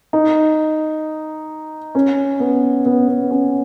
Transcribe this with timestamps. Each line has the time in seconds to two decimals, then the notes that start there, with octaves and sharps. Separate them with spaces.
0.13 D#4
1.95 C#4
2.40 B3
2.86 B3
3.08 B3
3.30 C#4